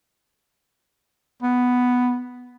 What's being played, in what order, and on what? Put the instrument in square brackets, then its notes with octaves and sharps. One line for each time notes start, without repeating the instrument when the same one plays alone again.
[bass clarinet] B3